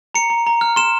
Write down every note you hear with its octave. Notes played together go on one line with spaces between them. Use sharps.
A#5 C#7
A#5
A#5
F6
C6 E7